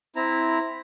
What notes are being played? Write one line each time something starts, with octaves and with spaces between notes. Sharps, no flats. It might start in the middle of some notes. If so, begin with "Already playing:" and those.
C4 E4 A#5